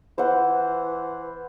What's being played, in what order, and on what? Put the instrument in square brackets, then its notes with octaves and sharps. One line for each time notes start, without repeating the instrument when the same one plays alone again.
[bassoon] E3 [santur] C5 F#5